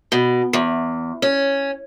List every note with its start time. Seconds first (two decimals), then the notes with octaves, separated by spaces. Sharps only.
0.12 B2
0.53 E2
1.22 C#4